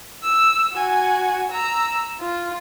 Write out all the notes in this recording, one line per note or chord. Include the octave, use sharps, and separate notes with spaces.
E6
F#4 G#5
A#5 E6
F4